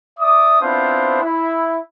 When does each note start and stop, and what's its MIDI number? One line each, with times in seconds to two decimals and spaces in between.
0.20 0.60 74
0.20 0.60 76
0.20 0.60 86
0.20 0.60 87
0.60 1.20 59
0.60 1.20 60
0.60 1.20 62
0.60 1.20 64
0.60 1.20 65
0.60 1.20 72
1.23 1.78 64